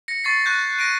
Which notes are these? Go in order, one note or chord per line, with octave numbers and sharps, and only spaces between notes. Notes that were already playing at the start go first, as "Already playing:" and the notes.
A#6 C#7
C#6 A6 C7
C#6 F#6 G6
A#6 D7 D#7